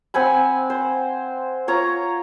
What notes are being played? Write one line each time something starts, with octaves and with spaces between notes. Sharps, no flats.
C4 F#5 G#5 B5
C5
F4 C#5 A#5